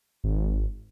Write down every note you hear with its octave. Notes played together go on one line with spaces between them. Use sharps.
G#1